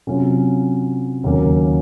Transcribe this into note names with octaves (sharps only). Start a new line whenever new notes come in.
C3 F#3 C#4 F4
D#2 C#3 F#3 A#3 C#4